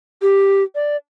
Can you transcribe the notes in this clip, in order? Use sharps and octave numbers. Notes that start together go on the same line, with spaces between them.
G4
D5